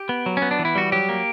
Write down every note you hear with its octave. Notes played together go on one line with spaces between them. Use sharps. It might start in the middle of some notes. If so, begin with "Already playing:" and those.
Already playing: G4
B3
F#3
C#4
B3
D4
E3
E4
G3 F#4
F#3 G4
A#3